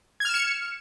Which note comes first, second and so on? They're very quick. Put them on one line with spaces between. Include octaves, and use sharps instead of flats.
G#6 F6 E7 C#7